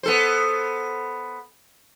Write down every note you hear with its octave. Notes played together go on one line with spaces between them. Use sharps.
B3 A4 C5